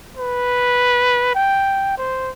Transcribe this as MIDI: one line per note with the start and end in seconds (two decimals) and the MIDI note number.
0.18 1.34 71
1.35 1.93 79
1.98 2.31 72